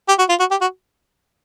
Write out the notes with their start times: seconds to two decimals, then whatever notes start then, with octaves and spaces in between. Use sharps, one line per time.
0.08 G4
0.19 F#4
0.29 F4
0.39 F#4
0.51 G4
0.61 F#4